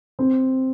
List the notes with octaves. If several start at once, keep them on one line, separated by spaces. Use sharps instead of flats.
C4